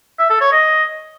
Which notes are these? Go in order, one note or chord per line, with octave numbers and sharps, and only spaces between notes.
E5
A4
C#5
D#5